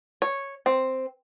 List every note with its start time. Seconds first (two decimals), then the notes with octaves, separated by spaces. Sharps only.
0.22 C#5
0.66 C4